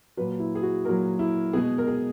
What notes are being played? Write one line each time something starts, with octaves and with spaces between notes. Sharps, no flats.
A#2 F#3 B4
E4
G#4
F#4
A#2 F#3 A#4
E4
B2 G#3 G#4
A#4
G#4